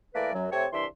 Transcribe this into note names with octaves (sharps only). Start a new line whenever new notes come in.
E3 A3 A#3 A#4 B4 D5
F#2 F#3
C3 A3 C4 C#5
C2 E3 D4 E5 C6